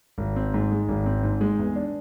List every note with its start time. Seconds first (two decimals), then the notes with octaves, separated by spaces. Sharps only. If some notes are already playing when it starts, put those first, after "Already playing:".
0.18 G#1
0.36 C4
0.54 G#2
0.71 G#3
0.89 G#1
1.06 C4
1.23 G#2
1.41 G#3
1.59 E2
1.76 D4